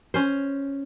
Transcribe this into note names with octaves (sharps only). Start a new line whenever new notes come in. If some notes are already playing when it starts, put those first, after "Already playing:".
C#4 C5